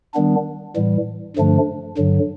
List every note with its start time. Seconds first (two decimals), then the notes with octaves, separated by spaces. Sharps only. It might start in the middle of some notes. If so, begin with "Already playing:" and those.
0.14 D#3 G3 B3 D4
0.76 A2 E3 G3
1.36 G2 D3 F3 A3 D4
1.98 G2 D3 F#3